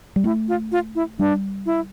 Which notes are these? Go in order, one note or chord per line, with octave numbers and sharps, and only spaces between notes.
G3
A3 E4
F4
F4
E4
G3 D4
E4